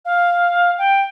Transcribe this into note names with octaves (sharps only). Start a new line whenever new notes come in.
F5
G5